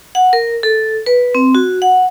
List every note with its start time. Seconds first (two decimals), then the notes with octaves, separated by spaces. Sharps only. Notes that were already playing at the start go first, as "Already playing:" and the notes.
0.15 F#5
0.33 A#4
0.63 A4
1.06 B4
1.35 C4
1.55 F#4
1.82 F#5